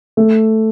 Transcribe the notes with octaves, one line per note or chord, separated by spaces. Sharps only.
A3